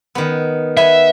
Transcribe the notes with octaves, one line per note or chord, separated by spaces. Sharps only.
D#3 B3
B3 E5 G#5